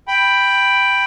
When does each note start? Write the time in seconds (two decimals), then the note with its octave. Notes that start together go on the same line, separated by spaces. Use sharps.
0.08 G5 B5